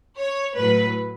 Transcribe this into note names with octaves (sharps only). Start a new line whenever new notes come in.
C#5
A2 F#3 B4